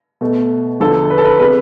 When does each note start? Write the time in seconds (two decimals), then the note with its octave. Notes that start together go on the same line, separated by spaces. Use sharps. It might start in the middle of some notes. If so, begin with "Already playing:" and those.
0.21 B2 A3
0.80 E2 D3 F3 A4
1.10 B4
1.18 A4
1.25 B4
1.39 C3 G#3 B4